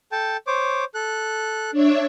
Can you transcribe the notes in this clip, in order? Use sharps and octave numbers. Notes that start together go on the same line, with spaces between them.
A4 G5 A5
C5 C#5 D6
A4 F#6
D4 C#5 E5